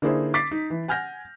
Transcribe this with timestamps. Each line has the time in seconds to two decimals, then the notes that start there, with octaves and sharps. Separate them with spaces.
0.02 D3 A#3 D#4 E4 G#4 C5
0.34 D6 A6 B6 C7
0.51 D#4
0.70 E3
0.88 F#5 G#5 F6 G6 A#6